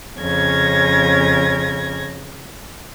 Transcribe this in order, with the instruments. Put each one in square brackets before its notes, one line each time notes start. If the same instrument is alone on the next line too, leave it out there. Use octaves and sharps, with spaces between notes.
[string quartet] F2 C#3 C#4 G#6 A#6